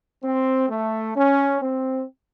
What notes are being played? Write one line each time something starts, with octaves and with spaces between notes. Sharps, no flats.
C4
A3
C#4
C4